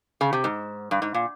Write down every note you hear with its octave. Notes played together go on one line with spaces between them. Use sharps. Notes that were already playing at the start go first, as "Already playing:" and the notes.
C#3
C3
G#2
G2
G#2
A#2